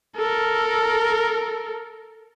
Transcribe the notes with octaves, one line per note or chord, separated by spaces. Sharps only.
A4 A#4